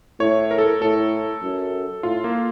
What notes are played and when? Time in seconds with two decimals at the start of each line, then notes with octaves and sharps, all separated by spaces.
0.20 A2 C#5
0.51 A#4
0.58 A4
0.66 A#4
0.81 A2 A4
1.42 F#2
2.03 A2 F4
2.24 A#3